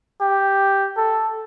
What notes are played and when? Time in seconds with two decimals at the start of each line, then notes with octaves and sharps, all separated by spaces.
0.21 G4
0.97 A4